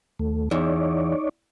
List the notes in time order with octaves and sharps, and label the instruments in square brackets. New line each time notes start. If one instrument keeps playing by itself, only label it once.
[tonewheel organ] D#2 A3
[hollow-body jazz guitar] E2 [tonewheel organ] D#4 C#5 D5